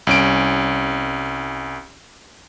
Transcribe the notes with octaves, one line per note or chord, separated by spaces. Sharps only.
C2 C#4 D7